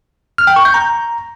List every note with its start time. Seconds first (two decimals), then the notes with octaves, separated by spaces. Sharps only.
0.38 F6
0.47 G5
0.56 C#6
0.65 G6
0.74 A#5